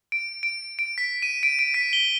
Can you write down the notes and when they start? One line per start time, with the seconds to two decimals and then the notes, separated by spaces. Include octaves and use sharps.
0.12 D7
0.43 D7
0.79 D7
0.98 B6
1.22 D#7
1.43 D7
1.59 D7
1.74 B6
1.93 G7